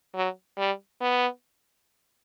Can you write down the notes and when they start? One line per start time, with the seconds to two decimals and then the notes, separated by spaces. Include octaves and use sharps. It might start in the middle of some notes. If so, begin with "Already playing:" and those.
0.14 F#3
0.58 G3
1.01 B3